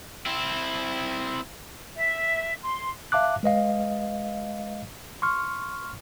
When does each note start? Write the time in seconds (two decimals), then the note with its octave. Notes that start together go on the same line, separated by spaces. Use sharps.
0.26 C4 E4
1.97 E5
2.62 C6
3.12 E5 F5 A5 D6 F#6
3.43 G#3 B4 D#5 F5
5.22 C6 C#6 F6